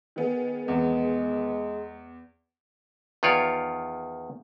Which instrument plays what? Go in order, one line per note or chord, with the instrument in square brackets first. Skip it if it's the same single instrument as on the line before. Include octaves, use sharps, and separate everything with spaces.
[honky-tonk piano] D#3 B3 G#4
[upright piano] E2 [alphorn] G#3
[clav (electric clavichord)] E2 D#3 F4 C#5 D5